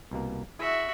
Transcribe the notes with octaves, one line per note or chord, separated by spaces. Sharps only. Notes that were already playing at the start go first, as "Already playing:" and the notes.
C2 B2 A#3
E4 F#4 G#4 E5